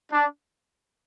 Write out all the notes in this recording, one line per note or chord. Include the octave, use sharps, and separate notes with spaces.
D4